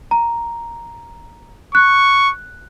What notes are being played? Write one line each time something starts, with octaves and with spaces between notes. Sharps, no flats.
A#5
C#6 F#6